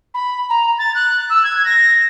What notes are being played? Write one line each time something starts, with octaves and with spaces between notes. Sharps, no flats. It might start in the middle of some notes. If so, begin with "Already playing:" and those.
B5
A#5
A6
F#6
E6
G#6
A#6